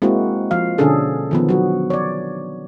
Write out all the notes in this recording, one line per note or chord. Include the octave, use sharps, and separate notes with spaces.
G#3 A#3 C4 E4 F#4
F3 F5
B2 D3 C#4 D4 G#4 A4
D#3 F3 B3
F#3 F#4
C#5 D5